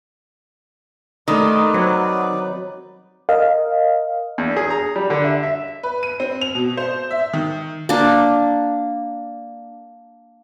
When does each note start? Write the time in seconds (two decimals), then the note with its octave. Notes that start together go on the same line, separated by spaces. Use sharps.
1.28 D#3 G3 A3 D#4 B4 D5
1.74 F#3 C4
3.29 A#4 D#5 F5
4.38 E2
4.57 G#4
4.70 A#5
4.96 G3
5.10 D3
5.25 E5
5.43 E5
5.83 B4
6.03 D#7
6.20 C4
6.41 F7
6.55 B2
6.77 C5
7.11 E5
7.33 D#3
7.89 A#3 D4